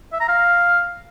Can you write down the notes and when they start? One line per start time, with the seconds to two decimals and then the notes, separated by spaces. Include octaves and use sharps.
0.12 E5
0.20 A#5
0.28 F5